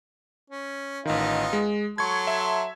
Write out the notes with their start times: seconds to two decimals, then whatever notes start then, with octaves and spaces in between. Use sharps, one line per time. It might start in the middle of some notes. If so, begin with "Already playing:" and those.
0.50 C#4
1.05 A1 D#3 B3 D#4 F4
1.53 G#3
1.98 F#3 A4 C6 C#6 G#6
2.27 E5